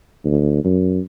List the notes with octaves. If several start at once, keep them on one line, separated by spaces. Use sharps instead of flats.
D2
F#2